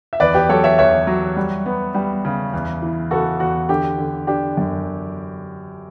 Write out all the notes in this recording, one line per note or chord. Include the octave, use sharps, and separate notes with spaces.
E5
E2 B4 D5
G4 B4
F#3 A4 C#5
C#5 E5
E2 C#5 E5
F#3
G3
B3
G3
C#3
E2
E3
C#3 F#4 A4
E2 F#4
D3 G4
D3
D4 G4
F#2